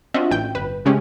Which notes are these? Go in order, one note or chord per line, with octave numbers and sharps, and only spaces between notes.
C4 D4 F4 F#4 D#5 E5
A1 G5 G6
G1 B4
C#3 G#3 A3 C#4 G4